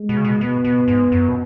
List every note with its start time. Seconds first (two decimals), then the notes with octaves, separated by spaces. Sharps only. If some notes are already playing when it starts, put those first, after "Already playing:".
Already playing: G#3
0.09 B2
0.17 C#3
0.25 B2
0.41 B2 B3
0.64 B2
0.88 G#2
1.12 F#2
1.28 B2